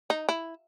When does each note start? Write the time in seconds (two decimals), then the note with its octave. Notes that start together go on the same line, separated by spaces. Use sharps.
0.10 D#4
0.29 E4